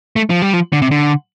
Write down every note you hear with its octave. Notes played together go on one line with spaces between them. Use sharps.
A3
F3
G3
F3
D3
C3
D3